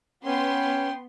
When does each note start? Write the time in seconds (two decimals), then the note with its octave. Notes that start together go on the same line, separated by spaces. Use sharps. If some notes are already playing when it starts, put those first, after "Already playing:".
0.25 B3 C#4 G5 C6